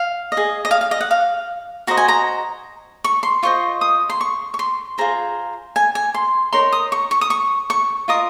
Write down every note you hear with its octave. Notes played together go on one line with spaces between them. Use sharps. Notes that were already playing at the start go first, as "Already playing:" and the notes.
Already playing: F5
D#5
G#4
D#5
F5
F5
D#5
F#5
F5
F#4 C5 D#5 A#5
G#5
A#5
C#6
C6
F4 C5 D#5 C#6
D#6
C6
C#6
C#6
C6
F4 G#4 C5 A#5
G#5
G#5
C6
D#4 A#4 C#5 C6
D#6
C#6
C#6
D#6
C#6
C#6
F4 A#4 D#5 D#6